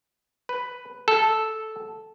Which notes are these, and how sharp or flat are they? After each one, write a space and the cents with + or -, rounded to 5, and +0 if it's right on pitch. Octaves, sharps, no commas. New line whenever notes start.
B4 +5
A4 -5